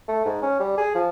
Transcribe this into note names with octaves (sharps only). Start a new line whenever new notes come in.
A3
G#2
C#4
G3
G#4
F3